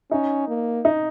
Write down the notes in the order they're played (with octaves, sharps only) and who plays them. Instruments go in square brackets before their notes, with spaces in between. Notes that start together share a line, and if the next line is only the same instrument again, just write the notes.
[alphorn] C#4 [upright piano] D#4
[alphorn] A#3
[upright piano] D#4